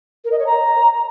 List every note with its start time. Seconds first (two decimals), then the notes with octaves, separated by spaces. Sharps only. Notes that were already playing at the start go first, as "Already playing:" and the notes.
0.25 A#4
0.32 D#5
0.39 C#5
0.46 A#5